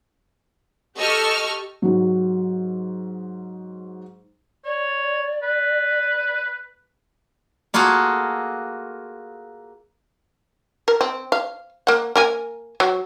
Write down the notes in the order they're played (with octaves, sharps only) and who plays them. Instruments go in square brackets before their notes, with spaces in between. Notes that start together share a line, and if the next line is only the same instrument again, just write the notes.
[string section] G4 A4 D#5 C#6 E6 F6
[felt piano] G#2 F#3
[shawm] C#5 [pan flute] D5
[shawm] B4
[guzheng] A#3 F4 F#4 G#4 A4
[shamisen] A#4
C4
F5
A#3 F#5
A#3 A#4 G#5
F#3